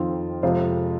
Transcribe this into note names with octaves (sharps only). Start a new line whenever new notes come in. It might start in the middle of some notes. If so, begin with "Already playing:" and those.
Already playing: F2 D#3 C4 F4
F2 C3 G#3 F4 C5